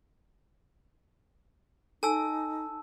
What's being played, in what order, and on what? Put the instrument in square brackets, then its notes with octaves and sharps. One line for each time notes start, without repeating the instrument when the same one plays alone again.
[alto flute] D#4 [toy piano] A4 G#5 [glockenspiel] A5 E6